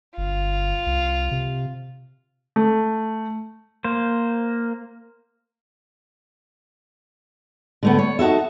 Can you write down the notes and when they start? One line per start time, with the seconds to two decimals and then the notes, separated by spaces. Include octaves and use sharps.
0.18 G1 F4
0.86 C2
1.31 C3
2.56 A3
3.84 A#3 C5
7.83 D3 A3 B3
7.99 C#5
8.19 D#4 F#4 A4 E5